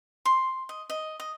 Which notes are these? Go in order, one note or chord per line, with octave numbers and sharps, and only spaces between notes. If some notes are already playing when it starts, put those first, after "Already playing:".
C6
D#5
D#5
D#5